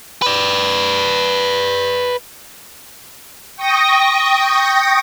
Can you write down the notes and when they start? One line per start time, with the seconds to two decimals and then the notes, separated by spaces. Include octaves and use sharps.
0.22 B4 D5
3.56 G5 C#6 D#6 A#6